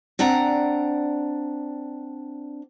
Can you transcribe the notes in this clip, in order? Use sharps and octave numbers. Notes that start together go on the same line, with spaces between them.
C4 D4 D5 F#5 A#5